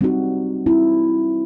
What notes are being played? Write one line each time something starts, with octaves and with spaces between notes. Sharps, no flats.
G3 C4 D#4 F#4
G3 C4 E4